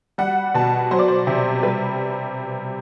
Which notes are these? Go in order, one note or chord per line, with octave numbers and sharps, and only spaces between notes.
G3 F#5
B2 A5
F#3 C5
D5
C5
C3
G3 B4